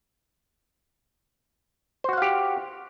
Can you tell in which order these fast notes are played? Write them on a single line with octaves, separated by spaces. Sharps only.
C5 F#4 F#5 F5 G4